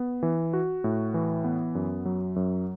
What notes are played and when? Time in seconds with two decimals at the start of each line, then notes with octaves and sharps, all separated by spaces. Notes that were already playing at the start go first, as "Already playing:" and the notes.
Already playing: B3
0.23 E3
0.53 F#4
0.84 A2
1.14 E3
1.44 B3
1.75 F#2
2.05 F#3
2.36 F#2